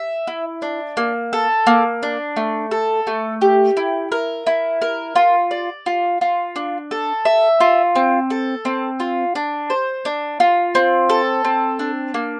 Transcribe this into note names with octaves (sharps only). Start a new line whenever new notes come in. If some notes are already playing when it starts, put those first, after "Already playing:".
Already playing: E5
E4
D4
A#3
A4
A#3
D4
A3
A4
A3
G4
E4
A#4
E4
A#4
F4
D5
F4
F4
D4
A4
E5
F4
C4
A4
C4
F4
D4
C5
D4
F4
C4
A4
C4
D4
A#3